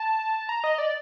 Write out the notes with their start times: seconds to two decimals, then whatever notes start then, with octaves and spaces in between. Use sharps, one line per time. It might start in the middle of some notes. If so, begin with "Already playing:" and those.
Already playing: A5
0.49 A#5
0.64 D#5
0.78 D5